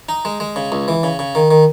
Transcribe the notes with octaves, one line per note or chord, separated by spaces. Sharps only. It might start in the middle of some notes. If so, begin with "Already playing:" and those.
D#4
G#3
G#3
C#3
C#2
E3
C#3
C#3
D#3
D#3